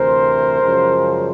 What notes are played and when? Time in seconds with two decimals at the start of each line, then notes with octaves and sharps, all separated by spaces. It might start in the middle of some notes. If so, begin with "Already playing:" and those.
Already playing: D2 C3 E3 A#4 C5
0.60 F#2 C#3 F3 G#3